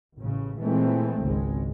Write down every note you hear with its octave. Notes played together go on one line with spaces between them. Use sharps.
A1 C#3
A#2 E3 G#3 A3 C4
G#1 C#2 G#2 G#3